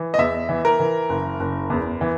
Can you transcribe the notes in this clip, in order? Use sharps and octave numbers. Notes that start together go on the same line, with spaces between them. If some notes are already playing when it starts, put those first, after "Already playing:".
Already playing: E3
D#5
E2 E5
E3
A#4
E3
F#1
F#1
E2
E3